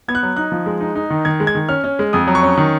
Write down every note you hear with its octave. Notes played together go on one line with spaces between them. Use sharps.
B3 G#6
F#6
F#3
D#4 F#6
F3
G#3
D#4
D#4
D#3
D#3 G#6
G#3
G#6
D#3
C#4 F6
C#4
G#3
F2 D#6
F#3
C#6
C#4
D#3